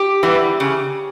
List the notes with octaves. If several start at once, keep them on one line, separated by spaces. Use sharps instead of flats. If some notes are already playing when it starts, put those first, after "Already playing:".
Already playing: G4
E3 G3 B3
C#3